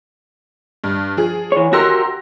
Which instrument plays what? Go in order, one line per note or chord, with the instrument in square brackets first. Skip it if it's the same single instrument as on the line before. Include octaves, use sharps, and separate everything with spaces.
[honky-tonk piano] G2
F3 G#4
[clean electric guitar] E3 C#5
[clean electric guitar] F#4 G4 A#4 [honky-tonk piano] C6 E6 A#6